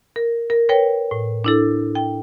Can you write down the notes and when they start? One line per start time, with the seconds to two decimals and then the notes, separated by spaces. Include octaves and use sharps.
0.16 A#4
0.50 A#4
0.69 A#4 B4 C#5 G5
1.11 A2
1.44 D4 E4 A4
1.95 G5